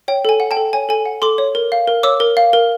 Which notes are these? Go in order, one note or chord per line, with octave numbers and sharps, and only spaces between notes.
C#5 G5
A4 G#5
F#5
G5 A5
A4
C#5 G#5
A4 G#5
F#5
A4 C6 D6
C#5
A#4
F5
A#4
C#5 D6 E6
A#4
F5
A#4